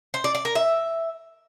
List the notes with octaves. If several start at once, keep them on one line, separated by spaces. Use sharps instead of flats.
C5
D5
D5
A#4
E5